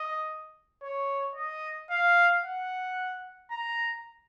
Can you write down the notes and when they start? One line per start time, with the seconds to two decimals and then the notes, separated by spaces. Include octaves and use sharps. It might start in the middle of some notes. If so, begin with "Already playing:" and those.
Already playing: D#5
0.82 C#5
1.35 D#5
1.90 F5
2.43 F#5
3.51 A#5